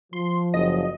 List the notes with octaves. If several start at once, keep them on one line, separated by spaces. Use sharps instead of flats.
F3 C6
F#1 D#5